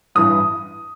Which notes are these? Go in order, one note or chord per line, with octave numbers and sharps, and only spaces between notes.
A1 G2 E3 D#6